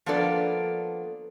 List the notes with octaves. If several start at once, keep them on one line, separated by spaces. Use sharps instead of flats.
F3 A#3 B3 D4 A4 D5